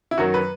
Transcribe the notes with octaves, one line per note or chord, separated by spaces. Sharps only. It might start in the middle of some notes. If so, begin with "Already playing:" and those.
E4
F#2 D#3 F#3 F#4
B4